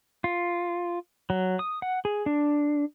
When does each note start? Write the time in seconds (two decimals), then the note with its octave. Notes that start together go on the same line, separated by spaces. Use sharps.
0.24 F4
1.30 F#3
1.59 D#6
1.82 F#5
2.05 G#4
2.26 D4